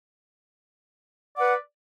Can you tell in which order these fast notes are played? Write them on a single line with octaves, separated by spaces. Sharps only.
D5 F#5 B4